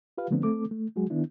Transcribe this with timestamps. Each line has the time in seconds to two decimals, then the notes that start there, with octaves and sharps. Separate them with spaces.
0.18 F4 G4 B4 F5
0.31 D3 F3 A3 B3 C4 D4
0.43 A3 C4 A4 D6
0.71 A3
0.96 F#3 G#3 F#4 G#4
1.10 D#3 B3 D4 E4